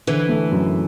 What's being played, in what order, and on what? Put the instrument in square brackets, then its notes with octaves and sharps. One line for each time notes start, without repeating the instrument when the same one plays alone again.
[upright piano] D3 [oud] E3
[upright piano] A3
F#2